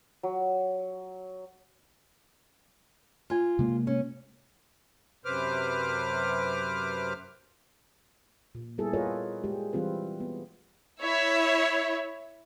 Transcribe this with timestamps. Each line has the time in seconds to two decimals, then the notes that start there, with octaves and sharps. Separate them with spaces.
0.23 F#3
3.30 F4 G#5
3.59 C3 G#3 A#3
3.87 C#4
5.25 F#2 C3 B4 C5 D6 F6
8.55 A#2
8.78 G3 B3 E4 G#4 A4
8.93 F4 G#4 A#4 B4 C#5 D#5
9.44 G#3 G4 G#4
9.73 E3 G3 C4 F4 B4
10.20 B3
11.02 E4 C#5 E5